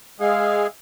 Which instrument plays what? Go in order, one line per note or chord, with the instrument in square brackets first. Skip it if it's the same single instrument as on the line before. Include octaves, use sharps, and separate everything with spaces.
[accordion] G#3 G#4 [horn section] E5 F5